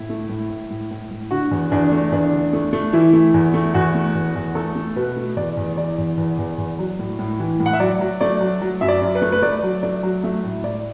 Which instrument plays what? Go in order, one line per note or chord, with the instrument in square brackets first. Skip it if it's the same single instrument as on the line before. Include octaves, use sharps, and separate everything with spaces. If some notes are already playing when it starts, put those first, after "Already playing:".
Already playing: [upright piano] A2 E4
A3
A2
A2
A2
A2
A2
D3 F#4
E2
E2 D4
A3
E2 D4
D3
A3
A3
E3 E4
A3
E2
A3
E2 F#4
A3
E2
E2
A3 A4
A3
B2 B4
A3
E2 D5
E2
E3 D5
E2
E2
E2
E2
F#3
A2
A2
E3
A2
F#5
E5
F#3 D5
F#3
A3 D5
F#3
F#3
F#2 E5
D5
F#2
B4
A3
B4
A3 D5
F#3
A3 D5
F#3
A3 E5
A2
A2 D5